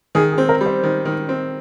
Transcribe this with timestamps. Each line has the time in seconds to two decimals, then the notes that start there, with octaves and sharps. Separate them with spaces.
0.15 D#3 G#4
0.32 G#4
0.38 C4
0.49 A#4
0.61 G3
0.66 C5
0.83 D#3
1.05 D#3
1.29 C4